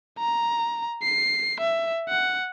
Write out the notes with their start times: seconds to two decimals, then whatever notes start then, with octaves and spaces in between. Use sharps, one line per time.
0.19 A#5
1.03 C7
1.60 E5
2.09 F#5